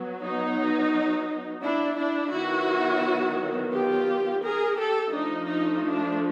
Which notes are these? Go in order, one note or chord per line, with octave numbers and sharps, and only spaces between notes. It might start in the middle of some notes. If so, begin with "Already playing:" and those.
Already playing: F#3 B3
D#4
D4 E4
D4 E4
D#3 F#3 B3 E4 F#4
F4 G4
G#4 A#4
G4 A4
F3 A3 D4 D#4
D#4
D4